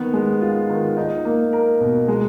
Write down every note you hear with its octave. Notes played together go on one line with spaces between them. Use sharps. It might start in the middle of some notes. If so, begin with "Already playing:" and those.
Already playing: D#3 B3
G#3
F4
D#3
D#4
A#3
A#4
B2
G#3